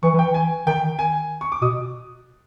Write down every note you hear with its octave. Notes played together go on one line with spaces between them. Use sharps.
E3 C#6
E3
G5
E3
G#5
D#3 G5
D#3
G#5
C#6
D6
B2 D#6